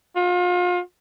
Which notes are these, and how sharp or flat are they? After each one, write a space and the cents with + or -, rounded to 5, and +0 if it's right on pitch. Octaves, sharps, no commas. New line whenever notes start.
F4 +35